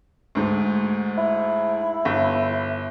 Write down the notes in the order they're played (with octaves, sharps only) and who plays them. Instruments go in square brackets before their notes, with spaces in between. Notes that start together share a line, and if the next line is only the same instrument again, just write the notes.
[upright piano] D2 G#2
[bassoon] E4
[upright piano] G1